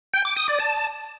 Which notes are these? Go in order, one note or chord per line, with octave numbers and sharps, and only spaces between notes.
G5
D6
D#6
D5
A5